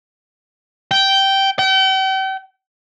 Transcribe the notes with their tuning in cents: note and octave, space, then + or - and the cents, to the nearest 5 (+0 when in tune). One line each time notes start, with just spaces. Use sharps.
G5 -10
G5 -40